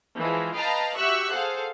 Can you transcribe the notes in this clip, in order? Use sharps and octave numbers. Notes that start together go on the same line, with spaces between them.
E3 F3 G#3
B4 D#5 F5 G5 A5 A#5
F#4 G4 E5 C#6 E6 F#6
G#4 A4 C5 F5 F#5